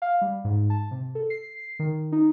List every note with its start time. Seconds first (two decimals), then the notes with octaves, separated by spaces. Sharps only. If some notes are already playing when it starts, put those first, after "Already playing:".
0.02 F5
0.21 G3
0.44 G#2
0.70 A5
0.91 C3
1.15 A4
1.30 C7
1.79 D#3
2.12 D#4